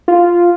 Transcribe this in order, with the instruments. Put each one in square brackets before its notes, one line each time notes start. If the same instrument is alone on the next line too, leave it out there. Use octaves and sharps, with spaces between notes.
[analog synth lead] F4